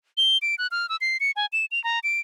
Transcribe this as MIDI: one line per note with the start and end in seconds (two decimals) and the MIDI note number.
0.17 0.38 103
0.42 0.55 98
0.58 0.67 90
0.71 0.89 89
0.89 0.96 88
1.01 1.17 96
1.20 1.31 97
1.36 1.46 80
1.53 1.65 100
1.72 1.82 101
1.84 1.99 82
2.04 2.20 98